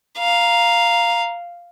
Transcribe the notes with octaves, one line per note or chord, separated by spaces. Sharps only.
F5 A#5